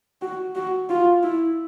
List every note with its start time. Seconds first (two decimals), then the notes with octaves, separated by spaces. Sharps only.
0.22 F#4
0.55 F#4
0.89 F4
1.23 E4